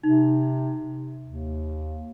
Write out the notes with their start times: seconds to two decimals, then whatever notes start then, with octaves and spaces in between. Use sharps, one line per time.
0.03 C3 D#4
1.25 D#2